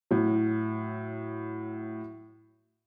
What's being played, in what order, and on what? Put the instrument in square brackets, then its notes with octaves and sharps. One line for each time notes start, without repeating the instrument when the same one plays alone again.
[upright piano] A2 F#3